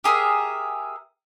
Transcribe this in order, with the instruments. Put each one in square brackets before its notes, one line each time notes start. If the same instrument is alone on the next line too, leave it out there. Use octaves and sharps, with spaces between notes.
[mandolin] G4 G#4 A#4 E5